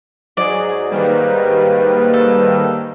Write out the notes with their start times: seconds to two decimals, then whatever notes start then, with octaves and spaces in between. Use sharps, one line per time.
0.37 G#2 F#3 G#4 D5
0.91 D#3 G3 A#3 B4
2.14 A4